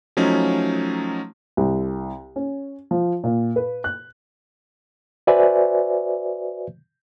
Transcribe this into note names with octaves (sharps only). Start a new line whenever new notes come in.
F3 F#3 A3 C#4 D#4
C2
C#4
F3
A#2
B4
F#6
F#4 B4 C5 D5 E5 G#5